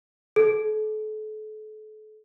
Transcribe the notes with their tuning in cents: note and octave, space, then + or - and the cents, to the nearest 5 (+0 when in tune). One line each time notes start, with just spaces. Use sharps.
A4 -35